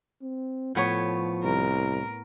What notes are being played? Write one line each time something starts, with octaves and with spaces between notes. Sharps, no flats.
C4
A2 F3 B3 C#5
C2 A#4